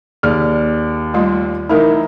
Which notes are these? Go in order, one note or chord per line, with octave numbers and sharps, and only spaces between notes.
D#2 G#4 D5 F6
G3 A3 F4
E3 A3 D#4 E4 A#4